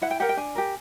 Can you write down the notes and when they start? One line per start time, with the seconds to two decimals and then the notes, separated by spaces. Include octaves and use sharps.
0.02 E4 F#5
0.11 G5
0.20 G4 A#4 F#5
0.29 G5
0.37 D4 G#5
0.55 G4 A#4